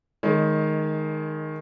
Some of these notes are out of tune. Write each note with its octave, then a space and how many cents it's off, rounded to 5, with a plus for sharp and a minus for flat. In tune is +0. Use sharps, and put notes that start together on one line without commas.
D#3 +0 G#3 +15 C#5 +35